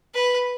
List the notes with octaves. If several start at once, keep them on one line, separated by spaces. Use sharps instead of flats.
B4